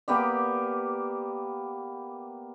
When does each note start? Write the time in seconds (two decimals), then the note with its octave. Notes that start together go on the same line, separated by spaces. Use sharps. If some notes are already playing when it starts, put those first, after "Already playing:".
0.08 A#3 B3 G4 D5